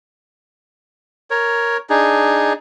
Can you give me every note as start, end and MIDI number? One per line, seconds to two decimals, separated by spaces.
1.30 1.77 70
1.30 1.77 73
1.89 2.53 62
1.89 2.53 63
1.89 2.53 68